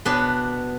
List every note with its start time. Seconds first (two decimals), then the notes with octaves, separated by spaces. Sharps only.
0.05 B2 B3 D4